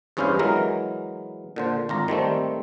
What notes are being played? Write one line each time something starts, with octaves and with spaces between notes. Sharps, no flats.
E2 G2 C#4 E4 C5 F5
E3 F#3 G#3 A#4
A#2 D3 C5
G#1 F4 A#5
D#3 G3 A3 C4